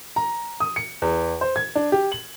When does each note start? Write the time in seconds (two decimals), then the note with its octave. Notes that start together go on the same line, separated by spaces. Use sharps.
0.16 A#5
0.60 D#6
0.76 C#7
1.02 E2
1.41 C5
1.56 G#6
1.75 D4
1.92 G4
2.12 F#7